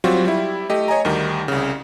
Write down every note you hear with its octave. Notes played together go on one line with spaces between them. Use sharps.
F#3 G3 C4 F4 F#4
G3 E4
A3 G4 D#5
C#5 D#5 G#5 A#5
D2 D#3 G3
C2 C#3